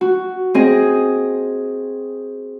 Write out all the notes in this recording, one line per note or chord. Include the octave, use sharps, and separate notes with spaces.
F#4
C4 G#4 D#5